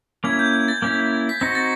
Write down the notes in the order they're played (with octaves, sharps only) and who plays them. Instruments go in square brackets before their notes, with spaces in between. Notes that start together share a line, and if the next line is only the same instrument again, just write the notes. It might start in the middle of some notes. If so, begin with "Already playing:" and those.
[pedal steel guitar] A#3 C#4 E4 [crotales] G#6
[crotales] G6
G#6
A6
[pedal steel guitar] A#3 C#4 E4
[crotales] B6
[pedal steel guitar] C4 D#4 F#4 [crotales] A#6
[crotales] A6